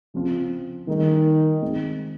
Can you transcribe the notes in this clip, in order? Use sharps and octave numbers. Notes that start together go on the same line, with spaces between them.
C#3 F3 C4 F4
D#3 G3 A#3 D#4 G#4
D#3 G#3 C4